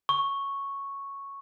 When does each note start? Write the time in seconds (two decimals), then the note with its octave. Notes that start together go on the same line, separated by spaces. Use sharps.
0.09 C#6